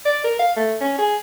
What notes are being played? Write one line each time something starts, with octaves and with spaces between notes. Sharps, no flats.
D5
A#4
F5
A3
C#4
G#4